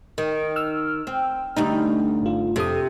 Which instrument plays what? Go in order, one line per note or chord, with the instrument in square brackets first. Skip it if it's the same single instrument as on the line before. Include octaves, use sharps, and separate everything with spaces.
[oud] D#3
[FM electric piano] E6 F6
[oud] C4
D2 G3 D#4
[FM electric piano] G#1 F4
[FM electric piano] F2 A4 D#6 [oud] C3